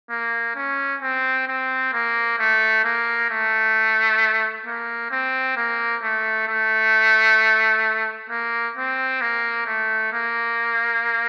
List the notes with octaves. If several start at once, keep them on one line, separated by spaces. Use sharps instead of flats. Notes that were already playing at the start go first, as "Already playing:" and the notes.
A#3
C#4
C4
C4
A#3
A3
A#3
A3
A#3
C4
A#3
A3
A3
A#3
C4
A#3
A3
A#3